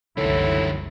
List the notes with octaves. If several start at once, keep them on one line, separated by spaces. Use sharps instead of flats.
F#1 C2 A2 D3 E3 E4